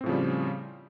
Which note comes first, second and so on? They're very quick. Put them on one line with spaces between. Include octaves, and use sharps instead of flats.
C4 A2 F3 C#3 G3